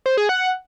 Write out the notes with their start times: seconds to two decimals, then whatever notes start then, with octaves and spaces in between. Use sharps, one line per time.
0.06 C5
0.17 G#4
0.29 F#5